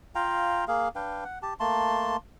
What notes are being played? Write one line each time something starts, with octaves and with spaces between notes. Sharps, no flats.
F4 F5 G5 A#5
A#3 G#4 F5
D4 B4 F5 G5
F#5
G4 A5
A3 A#3 A5 C6